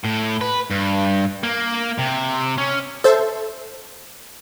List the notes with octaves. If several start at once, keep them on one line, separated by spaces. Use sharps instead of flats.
A2
B4
G2
A#3
C3
C#4
A4 C5 E5